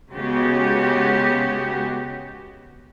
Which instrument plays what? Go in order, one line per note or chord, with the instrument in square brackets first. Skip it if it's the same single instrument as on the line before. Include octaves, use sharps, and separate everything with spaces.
[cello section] C#3 G#3 B3 F#4 G4